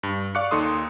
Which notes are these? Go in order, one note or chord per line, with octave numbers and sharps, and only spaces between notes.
G2
D5 F5 C#6 D6 F#6 C#7
D#2 D#4 A4 C6 D#6